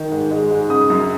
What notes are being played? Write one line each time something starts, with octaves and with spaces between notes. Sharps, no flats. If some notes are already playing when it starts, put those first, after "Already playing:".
Already playing: D#3
G#2
G#3
G#2
C#3 D#6
F#2